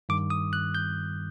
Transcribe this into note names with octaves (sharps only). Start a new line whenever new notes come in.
G2 D#3 G3 D6
D#6
F#6
G6